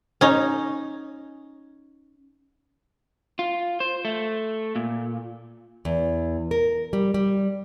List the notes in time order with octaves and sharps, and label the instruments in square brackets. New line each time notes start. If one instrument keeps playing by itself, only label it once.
[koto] C#4 D#4
[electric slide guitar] F4
C5
A3
A#2
[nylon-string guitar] E2
A#4
G3
G3